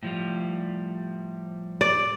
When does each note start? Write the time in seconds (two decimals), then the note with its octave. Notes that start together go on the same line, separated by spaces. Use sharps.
0.03 A2 F3 G3
1.81 D5